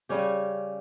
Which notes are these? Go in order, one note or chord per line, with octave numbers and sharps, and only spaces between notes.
C#3 G3 C#4 G4